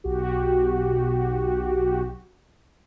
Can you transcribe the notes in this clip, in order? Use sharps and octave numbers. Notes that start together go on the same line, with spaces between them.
B1 F#4 G4